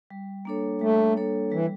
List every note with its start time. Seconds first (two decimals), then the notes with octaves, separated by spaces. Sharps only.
0.10 G3
0.45 A#3 D4 A4 C#5
0.81 G3 A3
1.16 A#3 D4 A4 C#5
1.52 E3 G3